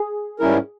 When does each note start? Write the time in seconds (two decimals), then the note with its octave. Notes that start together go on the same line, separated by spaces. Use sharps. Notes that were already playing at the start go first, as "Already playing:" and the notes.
Already playing: G#4
0.39 G#2 G3 C#4 E4 A#4